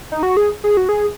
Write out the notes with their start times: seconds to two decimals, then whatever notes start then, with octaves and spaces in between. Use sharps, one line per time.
0.12 D#4
0.23 F#4
0.37 G#4
0.64 G#4
0.77 F#4
0.89 G#4